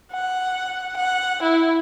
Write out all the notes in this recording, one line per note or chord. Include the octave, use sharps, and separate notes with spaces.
F#5
F#5
E4